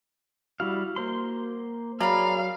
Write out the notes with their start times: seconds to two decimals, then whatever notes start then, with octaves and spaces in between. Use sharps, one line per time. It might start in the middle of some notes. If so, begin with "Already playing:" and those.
0.60 G3 E4 F#4 F5
0.96 A#3 C5 C6
2.00 F#3 G#4 A#4 D5 F5 A#5 B5